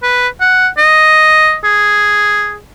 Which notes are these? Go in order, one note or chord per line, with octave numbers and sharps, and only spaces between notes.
B4
F#5
D#5
G#4